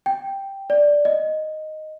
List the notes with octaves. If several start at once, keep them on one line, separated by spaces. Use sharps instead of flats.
G5
D5
D#5